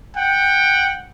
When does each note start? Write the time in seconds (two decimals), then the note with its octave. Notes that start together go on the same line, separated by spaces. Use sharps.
0.17 F#5 G5